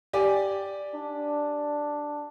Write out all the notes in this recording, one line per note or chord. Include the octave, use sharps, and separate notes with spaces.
G4 D5 G#5
D4